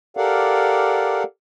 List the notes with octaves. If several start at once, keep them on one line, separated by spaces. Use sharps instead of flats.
G4 A4 A#4 D5 F5 F#5